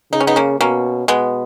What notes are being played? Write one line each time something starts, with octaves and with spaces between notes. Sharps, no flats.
C#3 D#4
C#4
B3 D#4
A#3 C#4
B2 A#3 C#4
B2 G#3 B3